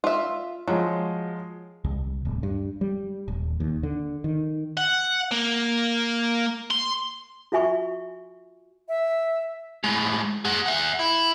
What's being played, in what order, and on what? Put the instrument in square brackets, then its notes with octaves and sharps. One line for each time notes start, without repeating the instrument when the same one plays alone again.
[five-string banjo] F4 E5
[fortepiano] F3 G#3 [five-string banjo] F#3
[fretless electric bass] C2
D1
G2
G3
D#1
D#2
D3
D#3
[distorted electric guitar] F#5
A#3
C6
[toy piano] F4 F#4 E5 G#5 B5 C#6
[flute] E5
[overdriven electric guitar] A2 G#3
G#4 F#5
E5 F#5
E4